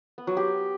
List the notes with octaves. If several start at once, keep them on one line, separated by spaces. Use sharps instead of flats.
B3
F#3
G4